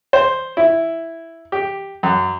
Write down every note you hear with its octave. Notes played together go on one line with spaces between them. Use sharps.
C5
E4
G4
F#2